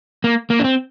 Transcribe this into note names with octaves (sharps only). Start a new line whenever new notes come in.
A#3
A#3
D4
C4